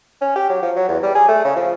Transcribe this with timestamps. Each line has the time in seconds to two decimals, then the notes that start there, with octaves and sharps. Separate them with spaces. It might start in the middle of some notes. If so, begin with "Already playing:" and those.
0.21 C#4
0.36 G4
0.50 F#3
0.62 F3
0.76 F#3
0.89 E2
1.03 G3
1.15 G#4
1.28 A3
1.44 C#3
1.56 F3